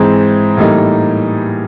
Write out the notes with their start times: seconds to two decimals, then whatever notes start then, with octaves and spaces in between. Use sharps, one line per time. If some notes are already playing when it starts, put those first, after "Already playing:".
Already playing: G#2 E3 G#3 C4
0.57 A2 E3 G3 A#3 D#4